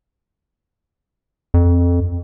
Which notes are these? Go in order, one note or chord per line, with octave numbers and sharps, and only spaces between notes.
F2